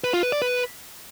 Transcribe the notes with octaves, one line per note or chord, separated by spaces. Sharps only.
B4
F4
B4
D5
B4